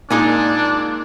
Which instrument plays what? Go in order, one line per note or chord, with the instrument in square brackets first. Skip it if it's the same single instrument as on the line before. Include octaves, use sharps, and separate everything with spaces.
[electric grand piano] A#2 [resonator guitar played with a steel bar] G#3 D#4 G#5 [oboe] D4